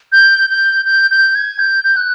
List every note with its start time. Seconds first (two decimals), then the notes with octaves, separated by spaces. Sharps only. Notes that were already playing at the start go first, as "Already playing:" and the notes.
0.12 G6
0.50 G6
0.85 G6
1.11 G6
1.35 G#6
1.59 G6
1.84 G6
1.96 F#6